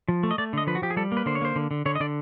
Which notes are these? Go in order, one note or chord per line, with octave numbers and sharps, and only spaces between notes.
F3
A3
D#5
A3 D5
D3 D#5
F3 B4
F#4
F3 G4
G#4
G3 A4
A#3
B4
D3 C5
C#5
A#3 C5
D3
D3
D3 C#5
D#5
D3 D5